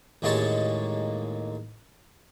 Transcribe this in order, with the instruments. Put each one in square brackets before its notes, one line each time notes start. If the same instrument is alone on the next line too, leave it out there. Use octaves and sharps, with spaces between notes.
[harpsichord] A1 D#2 G#3 A#3 C#5 A5